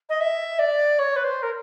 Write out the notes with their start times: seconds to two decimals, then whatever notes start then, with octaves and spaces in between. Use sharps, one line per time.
0.09 D#5
0.20 E5
0.58 D5
0.98 C#5
1.16 B4
1.23 C5
1.42 A#4